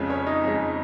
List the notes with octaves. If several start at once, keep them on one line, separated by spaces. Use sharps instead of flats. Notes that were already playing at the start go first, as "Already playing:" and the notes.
Already playing: F2 C#3 G#3
C#4 C#5
D#4 D#5
F2 C#3 G#3